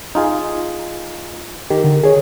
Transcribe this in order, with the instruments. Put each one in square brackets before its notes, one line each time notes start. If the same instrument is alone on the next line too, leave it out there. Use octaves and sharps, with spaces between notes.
[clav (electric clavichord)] D#4 F4 G#4
[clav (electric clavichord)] D#3 [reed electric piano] G4
[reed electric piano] D3
G#4 C#5